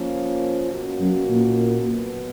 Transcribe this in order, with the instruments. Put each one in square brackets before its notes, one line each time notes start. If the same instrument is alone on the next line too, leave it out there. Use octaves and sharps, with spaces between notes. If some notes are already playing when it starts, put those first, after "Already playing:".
Already playing: [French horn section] F3 A#3 C#4
B2 A#3 C#4 F#4
[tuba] F#2
A#2
[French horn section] B2 F#3 B3